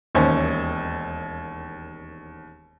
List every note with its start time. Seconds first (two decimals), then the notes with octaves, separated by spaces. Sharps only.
0.15 E1 D#2 C#4 C5